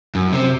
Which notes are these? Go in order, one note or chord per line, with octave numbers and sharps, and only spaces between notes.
F#2
C3